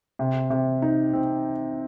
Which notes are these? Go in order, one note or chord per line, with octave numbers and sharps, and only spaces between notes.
C3
C3
D#4
C4